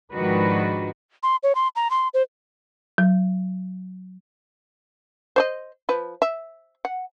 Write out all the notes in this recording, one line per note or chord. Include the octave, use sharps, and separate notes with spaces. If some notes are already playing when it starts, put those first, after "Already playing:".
G#2 D#3 F3 D4 F#4 B4
C6
C#5
C6
A#5
C6
C5
F#3
C5 C#5 D#5
F3 B4
E5
F#5